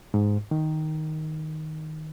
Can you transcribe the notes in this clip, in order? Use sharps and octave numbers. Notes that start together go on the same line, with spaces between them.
G#2
D#3